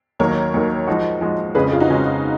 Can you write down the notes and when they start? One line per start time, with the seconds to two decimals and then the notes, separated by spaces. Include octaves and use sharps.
0.19 D#2 D#3 F#3 A#3 A#4 C#5
0.54 D#2 D#3 F#3 A#3
0.87 F3 G#3 D#4 F#4
1.21 F3 G#3 D#4 F#4
1.55 F2 C#3 G#3 C#4 G#4 B4
1.72 F4 G#4
1.80 D#4 F#4
1.88 F2 C#3 G#3 C#4